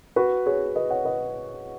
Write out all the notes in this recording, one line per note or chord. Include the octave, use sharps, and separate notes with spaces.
F#4 B4
G#4 C#5
B4 D#5
C#5 F#5
B4 D#5